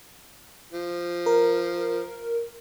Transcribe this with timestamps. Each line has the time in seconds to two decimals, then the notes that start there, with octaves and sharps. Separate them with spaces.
0.73 F3
1.26 A#4